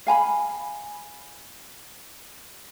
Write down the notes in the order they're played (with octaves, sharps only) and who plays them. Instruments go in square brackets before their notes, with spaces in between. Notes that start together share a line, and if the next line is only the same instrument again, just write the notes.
[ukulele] F5 G#5 A#5 B5